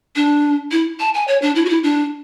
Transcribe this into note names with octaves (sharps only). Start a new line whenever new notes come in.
D4
E4
A5
G#5
C#5
D4
E4
F#4
E4
D4